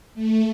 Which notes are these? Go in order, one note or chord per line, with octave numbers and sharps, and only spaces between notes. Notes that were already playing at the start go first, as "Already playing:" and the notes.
A3